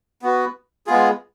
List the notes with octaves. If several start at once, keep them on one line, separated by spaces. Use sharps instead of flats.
B3 F#4 B4
G#3 B3 F4 G#4